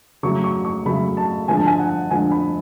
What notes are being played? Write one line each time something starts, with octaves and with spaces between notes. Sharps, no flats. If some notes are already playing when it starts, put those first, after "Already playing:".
C#3 F#3 A3 C#6
C#6
C#6
C#3 F#3 A3 B5
A5
D3 F3 G#3 D4 G#5
A5
G#5
F#5
D3 F3 G#3 D4 G#5
B5